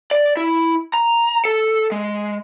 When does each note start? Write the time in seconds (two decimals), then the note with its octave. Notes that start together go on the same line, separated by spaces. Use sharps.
0.11 D5
0.37 E4
0.94 A#5
1.45 A4
1.92 G#3